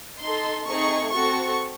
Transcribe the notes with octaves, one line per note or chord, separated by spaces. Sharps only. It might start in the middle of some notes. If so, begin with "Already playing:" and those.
D#4 A4 C6
A3 C4 D#4 G#4 C#6
C4 F#4 A4 C#6